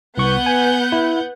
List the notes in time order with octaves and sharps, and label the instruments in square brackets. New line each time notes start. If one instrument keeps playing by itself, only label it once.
[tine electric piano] C2 C#6 [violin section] B3 F#5 G6
[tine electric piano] G#5
E4